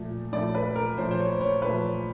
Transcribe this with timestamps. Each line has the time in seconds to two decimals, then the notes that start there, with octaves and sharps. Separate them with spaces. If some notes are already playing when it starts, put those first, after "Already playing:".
Already playing: A#2 F3 A3
0.33 A#2 F3 A3 D5
0.55 B4
0.76 A#4
0.98 A#2 F3 A3 C5
1.11 C5
1.20 C#5
1.41 C#5
1.62 A#2 F3 A3 B4